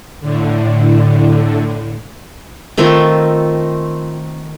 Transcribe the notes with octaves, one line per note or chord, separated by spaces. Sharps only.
A2 D3
D#3 A3 C4 F4